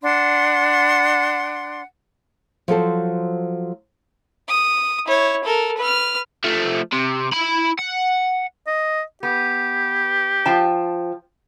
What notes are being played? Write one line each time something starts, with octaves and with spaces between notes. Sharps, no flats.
D4 F#5 C6
F3 F#3 A4 C5
D#6
E4 C#5
A4 A#4
B4 F6
F3 A3
C3
E4 B5
F#5
D#5
B3 G4
F3 G5 A5